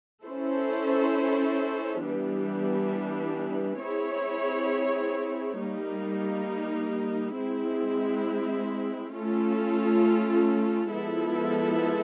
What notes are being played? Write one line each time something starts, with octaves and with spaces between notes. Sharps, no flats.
C#4 E4 A4 C5
E3 G3 B3 D4
C4 E4 G#4 C#5
G3 A#3 D#4
G#3 C4 E4
A3 C#4 F4 A4
F3 G#3 B3 E4 A4